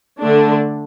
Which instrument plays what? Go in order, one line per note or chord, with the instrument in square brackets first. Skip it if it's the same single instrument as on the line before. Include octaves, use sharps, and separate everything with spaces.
[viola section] D3 A3 D4